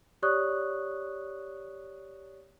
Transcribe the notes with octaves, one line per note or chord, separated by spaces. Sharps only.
G4 C#5 D5 C#6 D#6 F#6